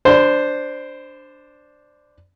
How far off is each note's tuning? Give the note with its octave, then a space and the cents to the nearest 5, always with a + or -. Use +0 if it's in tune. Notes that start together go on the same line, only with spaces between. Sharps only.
D4 +0 C5 +0 B5 +40